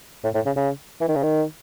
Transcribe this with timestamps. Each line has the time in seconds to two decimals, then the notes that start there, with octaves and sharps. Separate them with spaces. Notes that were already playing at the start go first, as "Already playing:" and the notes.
0.24 A2
0.35 A2
0.46 C#3
0.56 C#3
1.01 E3
1.08 D#3
1.15 C#3
1.23 D#3